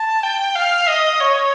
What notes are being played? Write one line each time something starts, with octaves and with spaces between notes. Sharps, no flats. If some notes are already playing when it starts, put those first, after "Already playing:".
Already playing: A5
G5
F5
D#5
C#5